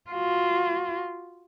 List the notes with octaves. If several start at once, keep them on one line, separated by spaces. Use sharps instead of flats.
F4 F#4